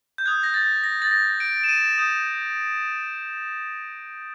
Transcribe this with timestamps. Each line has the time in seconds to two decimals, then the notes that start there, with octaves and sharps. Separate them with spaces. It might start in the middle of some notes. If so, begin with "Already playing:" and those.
0.18 G6
0.26 D#6 F#6 G#6
0.43 A#6
0.54 A6
0.84 A#6
1.02 A6
1.11 A#6
1.40 D7
1.64 E7
1.69 D#7
1.98 D#6 G6